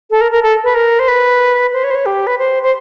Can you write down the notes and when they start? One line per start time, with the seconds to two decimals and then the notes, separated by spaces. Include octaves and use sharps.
0.11 A4
0.21 A#4
0.32 A#4
0.43 A4
0.64 B4
0.75 A#4
0.99 C5
1.08 B4
1.73 C5
1.84 C#5
1.91 C5
1.95 C#5
2.06 G4
2.27 B4
2.38 C5
2.63 C5